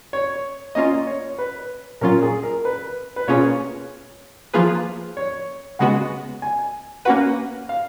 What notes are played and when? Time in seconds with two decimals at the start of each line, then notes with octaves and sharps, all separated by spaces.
0.13 C#5
0.75 A#3 C#4 F4 D#5
1.07 C#5
1.38 B4
2.01 A#2 F#3 C#4 F4 A#4
2.22 G#4
2.43 A#4
2.65 B4
3.16 B4
3.28 B2 A#3 C#4 F4 G#4 C#5
4.54 F3 A#3 F4 G#4 B4
5.17 C#5
5.79 C#3 G#3 B3 F#4 F#5
6.42 G#5
7.05 A#3 C#4 F#4 B4 F#5
7.69 F5